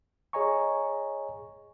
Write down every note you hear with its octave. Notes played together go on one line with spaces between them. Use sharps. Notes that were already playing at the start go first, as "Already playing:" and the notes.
G#4 C#5 D#5 G#5 A#5 C#6